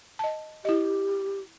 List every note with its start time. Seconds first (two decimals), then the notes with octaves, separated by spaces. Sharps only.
0.19 D#5 A5
0.65 E4 G4 D#5